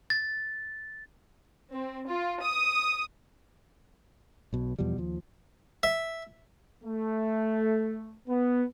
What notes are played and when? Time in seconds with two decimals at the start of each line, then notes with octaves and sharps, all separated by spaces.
0.10 A6
1.74 C4
2.08 F4
2.43 D#6
4.53 B1 B2
4.79 E2 B2 F3 G3
4.98 D#2 F3
5.83 E5
6.84 A3
8.28 B3